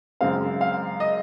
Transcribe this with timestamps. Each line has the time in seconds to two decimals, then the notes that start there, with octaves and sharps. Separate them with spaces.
0.21 F#2 C#3 G#3 C4 F5
0.61 F5
1.00 D#5